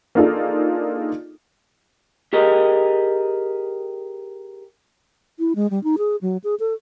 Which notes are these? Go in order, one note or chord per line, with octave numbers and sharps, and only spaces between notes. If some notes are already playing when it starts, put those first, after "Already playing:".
A#3 D4 D#4 F4 G#4 A4
G4 G#4 A#4 D#5
E4
G#3
G3
D#4
G#4
F#3
G#4
A4